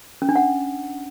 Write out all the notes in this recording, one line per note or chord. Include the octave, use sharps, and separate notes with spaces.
C#4
D4
F#5